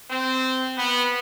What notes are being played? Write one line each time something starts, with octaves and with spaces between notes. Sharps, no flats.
C4
B3